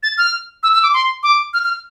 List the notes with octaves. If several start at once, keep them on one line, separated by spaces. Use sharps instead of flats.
A6
F6
E6
E6
D6
C6
D6
F6
F6